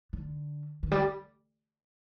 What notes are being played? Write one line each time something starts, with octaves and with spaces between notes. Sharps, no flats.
D3
D#3
G3